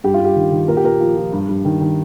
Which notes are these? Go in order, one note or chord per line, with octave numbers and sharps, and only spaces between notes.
G2 G4
F4
G2
G4
D#3
D#3
A#2 A#4
G4
A#2 A#4
F3
F3
G2
G2
D#3
D#3